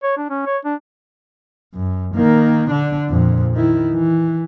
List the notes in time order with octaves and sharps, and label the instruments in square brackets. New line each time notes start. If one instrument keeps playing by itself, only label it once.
[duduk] C#5
D4
C#4
C#5
D4
[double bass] F#2
D#3 A#3
D3 D4
F2 A#2
D#3 E4
E3